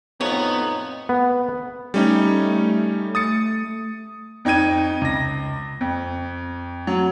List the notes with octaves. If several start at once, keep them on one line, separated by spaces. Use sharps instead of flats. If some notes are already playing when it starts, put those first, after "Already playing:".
F2 A2 B3 D#4 C#5
B3
G3 A3 C#4 D#4
D#6 A6 C#7
F2 D#4 G5 G#6 D#7
C#2 A#6
F2
F#3